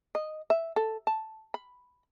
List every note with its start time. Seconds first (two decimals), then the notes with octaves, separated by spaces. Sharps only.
0.15 D#5
0.50 E5
0.76 A4
1.07 A5
1.54 B5